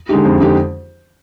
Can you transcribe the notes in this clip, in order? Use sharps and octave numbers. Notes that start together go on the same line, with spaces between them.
D3 G#3 D#4 G4
F2
D3 G#3 D#4 G4